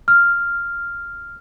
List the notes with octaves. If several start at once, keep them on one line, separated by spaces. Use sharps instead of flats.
F6